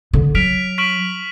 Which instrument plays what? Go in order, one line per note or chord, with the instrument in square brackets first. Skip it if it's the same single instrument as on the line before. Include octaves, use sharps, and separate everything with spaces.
[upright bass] D3
[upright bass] F#3 [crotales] F6 B6 D7 F7
[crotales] C#6 F6 B6 D7 F#7